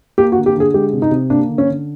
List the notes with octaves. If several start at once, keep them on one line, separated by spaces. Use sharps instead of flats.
A#3 G4
F#4
D3
G4
D3 G#4
G#3 G4
C3
D#4
C3
A#3 D4
D3
C#4
D3